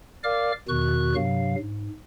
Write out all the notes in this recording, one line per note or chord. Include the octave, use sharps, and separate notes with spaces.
A#4 D5 F5 D6 F6
E2 B2 D#3 F#4 C#6 F#6
G2 C3 F#3 F5
G#2